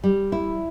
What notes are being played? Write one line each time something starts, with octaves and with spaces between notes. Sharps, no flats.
G3
E4